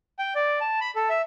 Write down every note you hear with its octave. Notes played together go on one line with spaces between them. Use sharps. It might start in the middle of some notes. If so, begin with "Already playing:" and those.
G5
D5
A5
B5
A4
E5